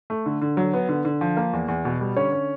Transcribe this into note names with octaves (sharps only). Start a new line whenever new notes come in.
A3
D3
D3
F#3
B3
D3
D3
F3
A#3
E2
E2
B2
G3
D3 C#4 C#5
C#4